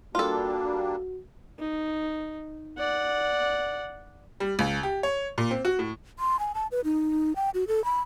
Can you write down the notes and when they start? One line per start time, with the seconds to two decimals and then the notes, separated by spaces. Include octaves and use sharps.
0.15 G3 A#3 D4 F4 F#4 A4
1.59 D#4
2.78 D5 F#5
4.40 G3
4.59 C#2
4.83 G4
5.03 C#5
5.38 A#2
5.51 C4
5.65 F#4
5.79 A2
6.19 C6
6.39 G#5
6.55 A5
6.72 B4
6.84 D#4
7.36 G5
7.54 F#4
7.68 A4
7.85 B5